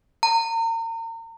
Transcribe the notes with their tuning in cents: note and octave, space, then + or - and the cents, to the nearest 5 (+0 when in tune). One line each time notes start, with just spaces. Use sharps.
A#5 -40